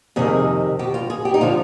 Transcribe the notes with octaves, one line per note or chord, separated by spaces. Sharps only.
F2 C3 D#3 G#4
B2 G4
F4
G#4
G4
D#4
D3 F3 F4